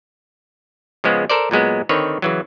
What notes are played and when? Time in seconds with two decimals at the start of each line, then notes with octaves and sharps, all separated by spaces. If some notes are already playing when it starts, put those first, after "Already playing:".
1.04 C#3 F3 G#3 B3
1.30 A4 A#4 C5 D5
1.51 A#2 F#3 G#3 B3
1.89 D3 D#3 C4 B4 C#5
2.22 C#3 E3 F#3